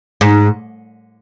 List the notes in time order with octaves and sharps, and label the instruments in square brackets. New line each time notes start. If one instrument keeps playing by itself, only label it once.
[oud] G#2